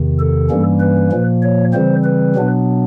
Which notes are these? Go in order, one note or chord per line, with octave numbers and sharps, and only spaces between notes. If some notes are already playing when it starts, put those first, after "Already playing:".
Already playing: E2 C3 D#3
A4
G2 E3 G3 A#3 C#4
B4
A#2 F3 A#3
C#5
C#3 E3 G3 C4 C5
B4
B2 F#3 B3 D4